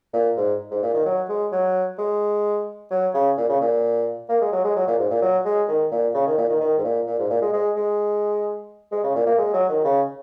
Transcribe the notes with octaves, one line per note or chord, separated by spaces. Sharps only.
A#2
G#2
G#2
A#2
D#3
F#3
G#3
F#3
G#3
F#3
C#3
A#2
C#3
A#2
A#3
G#3
F#3
G#3
F#3
A#2
G#2
A#2
F#3
G#3
D#3
A#2
C#3
D#3
A#2
D#3
D#3
G#2
A#2
A#2
G#2
A#2
G#3
G#3
G#3
G#3
C#3
A#2
A#3
G#3
F#3
D#3
C#3